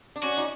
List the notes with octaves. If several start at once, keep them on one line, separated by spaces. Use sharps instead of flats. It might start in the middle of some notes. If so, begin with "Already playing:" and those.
D4
C#4 F#4
D#4